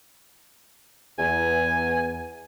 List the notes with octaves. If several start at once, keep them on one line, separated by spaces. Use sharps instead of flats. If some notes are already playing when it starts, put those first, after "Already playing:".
E2 G#5